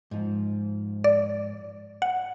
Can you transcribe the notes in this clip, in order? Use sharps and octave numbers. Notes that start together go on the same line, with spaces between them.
G#2 F3
D5
F#5